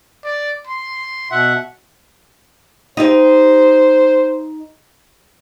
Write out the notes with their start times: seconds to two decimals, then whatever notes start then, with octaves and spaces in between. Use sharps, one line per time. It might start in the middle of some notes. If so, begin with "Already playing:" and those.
0.24 D5
0.67 C6
1.31 B2 E5 F#5
2.97 D#4 G4 C5 D#5